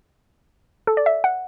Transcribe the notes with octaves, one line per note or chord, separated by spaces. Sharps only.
A4
D5
E5
F#5